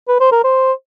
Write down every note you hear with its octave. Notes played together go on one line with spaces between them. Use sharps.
B4
C5
A#4
C5